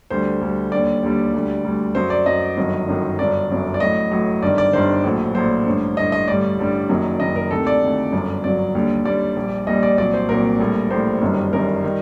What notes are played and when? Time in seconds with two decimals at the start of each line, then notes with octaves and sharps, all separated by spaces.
0.10 D2 D3 G3 C5
0.41 D2 D3 G3
0.72 D#2 D3 G3 D5
1.03 D#2 D3 G3
1.34 D2 D3 G3
1.65 D2 D3 G3
1.95 F#2 F#3 C5
2.10 D5
2.26 F#2 F#3 D#5
2.57 G1 F#2 D#3 F#3
2.88 G1 F#2 D#3 F#3
3.18 G1 F#2 F#3 D5
3.50 G1 F#2 F#3
3.74 D5
3.80 A1 A2 F#3 D#5
4.12 A1 A2 F#3
4.42 G1 G2 D#3 D5
4.58 D5
4.73 G1 G2 D#3 C5
5.04 A#1 A2 F#3
5.35 A#1 A2 F#3 C5
5.66 A1 G2 D3
5.96 A1 G2 D3 D#5
6.12 D#5
6.28 A1 G2 D3 G3 D5
6.59 A1 G2 D3 G3
6.89 F#1 F#2 D#3 F#3
7.20 F#1 F#2 D#3 F#3 D#5
7.36 A#4
7.51 D2 C3 D#3 A4
7.67 D5
7.82 D2 C3 D#3
8.12 G1 F#2 F#3
8.44 G1 F#2 F#3 D5
8.75 D#2 D3 G3
9.05 D#2 D3 G3 D5
9.37 A#1 A#2 G3
9.66 A#1 A#2 G3 D#5
9.83 D5
9.98 C2 A#2 F#3 D5
10.13 C5
10.29 C2 A#2 F#3 A#4
10.60 A#1 A2 G3
10.91 A#1 A2 G3 C5
11.21 G1 F#2 D#3 G3
11.53 G1 F#2 D#3 G3 A#4
11.84 D#3 G3